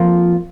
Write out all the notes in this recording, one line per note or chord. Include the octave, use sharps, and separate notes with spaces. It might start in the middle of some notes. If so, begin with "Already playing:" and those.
Already playing: F2 F3 A#3 F4